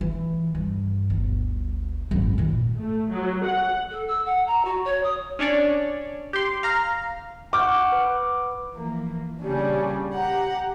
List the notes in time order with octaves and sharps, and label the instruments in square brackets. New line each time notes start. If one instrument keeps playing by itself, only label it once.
[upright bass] E3
G2
G1 D2
G#1 F#2
A#2 D#3
[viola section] A3
F#3
F#5
[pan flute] A4
E6
F#5
A#5
F#4
C#5
D#6
[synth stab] C#4 D4 C#5 D5
G4 C6
F5 A#5 F6
[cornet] F#5 [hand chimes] C#6 F6 G6 [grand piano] D6
[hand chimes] B4
[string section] E3 F3 A#3
A#2 C#3 G3 C#4 D4 G#4
G4 F#5 A#5